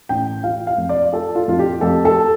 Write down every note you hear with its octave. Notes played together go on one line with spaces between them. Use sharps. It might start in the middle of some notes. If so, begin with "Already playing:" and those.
A1 G5
F4 F5
F5
F2
D5
F4 A4
F4
F2 F4
G4
F2 A4
A4